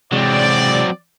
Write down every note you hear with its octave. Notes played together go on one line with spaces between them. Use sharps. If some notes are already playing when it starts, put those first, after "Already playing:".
C3 E3 F#3 G#3 C4 D5